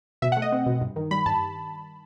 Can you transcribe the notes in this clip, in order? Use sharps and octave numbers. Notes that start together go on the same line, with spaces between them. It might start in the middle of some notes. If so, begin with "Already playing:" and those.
B2 E5
F#5
A3
D#5
C4
B2
G2
D#3
G3 B5
G2 A5